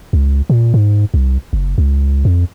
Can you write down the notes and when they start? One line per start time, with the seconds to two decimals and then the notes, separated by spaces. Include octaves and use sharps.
0.13 C#2
0.50 A#2
0.74 G#2
1.14 C2
1.53 F#1
1.78 C#2
2.25 F2